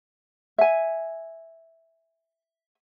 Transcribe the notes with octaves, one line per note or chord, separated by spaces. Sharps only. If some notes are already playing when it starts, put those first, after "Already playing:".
E5 G#5